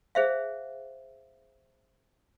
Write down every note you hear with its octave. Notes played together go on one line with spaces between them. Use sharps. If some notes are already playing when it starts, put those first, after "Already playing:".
G#4 C5 E5 F5